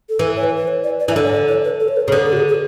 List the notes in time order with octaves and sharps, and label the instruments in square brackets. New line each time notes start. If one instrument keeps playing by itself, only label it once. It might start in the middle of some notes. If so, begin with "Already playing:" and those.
[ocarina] A4
[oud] E3 [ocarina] B4
[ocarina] C#5
B4
B4
C#5
D5
D5
[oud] E3 [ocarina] E5
[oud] D3 [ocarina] D5
[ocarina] C#5
D5
C#5
B4
A4
C#5
B4
[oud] C#3
[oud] D3 [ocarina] B4
[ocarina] A4
F#4
G#4
G#4